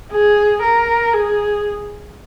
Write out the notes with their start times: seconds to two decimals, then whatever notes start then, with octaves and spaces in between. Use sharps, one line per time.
0.12 G#4
0.62 A#4
1.13 G#4